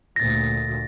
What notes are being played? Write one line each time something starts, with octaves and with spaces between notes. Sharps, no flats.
D2 A#2 A6 A#6